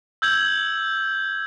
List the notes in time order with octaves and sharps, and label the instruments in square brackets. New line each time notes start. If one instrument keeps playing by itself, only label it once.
[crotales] E6 G6 G#6 F#7